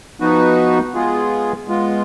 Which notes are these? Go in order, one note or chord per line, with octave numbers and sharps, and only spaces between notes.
F3 B3 D#4 F#4 B4
G#3 B3 F4 G#4
G#3 B3 F4